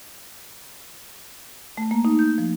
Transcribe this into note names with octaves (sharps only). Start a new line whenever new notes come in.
A3
A#3
D#4
G6
F3